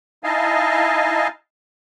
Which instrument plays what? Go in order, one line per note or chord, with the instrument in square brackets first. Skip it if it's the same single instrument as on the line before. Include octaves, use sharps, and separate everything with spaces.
[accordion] D#4 E4 D#5 F5 G#5 A5